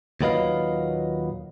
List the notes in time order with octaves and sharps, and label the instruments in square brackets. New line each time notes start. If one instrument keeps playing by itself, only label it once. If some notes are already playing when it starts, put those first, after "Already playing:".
[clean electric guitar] D#2 A#2 F#3 B4 D#5 F5